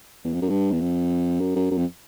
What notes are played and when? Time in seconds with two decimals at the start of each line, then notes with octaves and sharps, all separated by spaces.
0.24 E2
0.33 F2
0.42 F#2
0.50 G2
0.72 E2
0.81 F2
1.40 F#2
1.56 F#2
1.71 F#2
1.78 F2